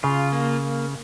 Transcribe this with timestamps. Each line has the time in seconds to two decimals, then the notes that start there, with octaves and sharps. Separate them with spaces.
0.03 C#3 F4
0.32 A#3